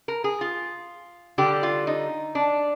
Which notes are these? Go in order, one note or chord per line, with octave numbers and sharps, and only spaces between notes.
A#4
G#4
F4
D3 G3 G4
F4
D#4
D4